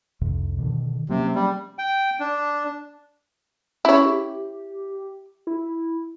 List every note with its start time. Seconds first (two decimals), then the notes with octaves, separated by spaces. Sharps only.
0.21 C2 F2 C3
0.58 B2 D3 D#3
1.09 C3 F#3 A#3 C#4
1.35 G3
1.79 G5
2.20 D4
3.85 C#4 E4 C#5
4.05 G4
5.47 E4